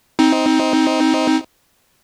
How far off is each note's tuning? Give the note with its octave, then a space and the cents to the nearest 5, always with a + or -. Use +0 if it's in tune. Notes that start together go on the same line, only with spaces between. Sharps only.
C4 +0 D#4 +20